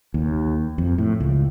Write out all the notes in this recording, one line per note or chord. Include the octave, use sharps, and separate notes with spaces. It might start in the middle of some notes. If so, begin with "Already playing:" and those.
D#2
F2
A2
C#2